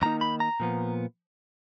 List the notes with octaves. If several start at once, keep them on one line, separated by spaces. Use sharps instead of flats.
F2 D#3 A#3 D#4 A#5
B5
A#5
A#2 F3 B3